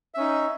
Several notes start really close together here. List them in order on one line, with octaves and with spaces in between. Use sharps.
E5 C#4 D#4